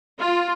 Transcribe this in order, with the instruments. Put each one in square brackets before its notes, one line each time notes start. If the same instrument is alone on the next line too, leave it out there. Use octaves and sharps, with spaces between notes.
[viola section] F4